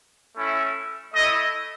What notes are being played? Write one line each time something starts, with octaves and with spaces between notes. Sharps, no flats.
A3 C#4 E4
A3 E4 D#5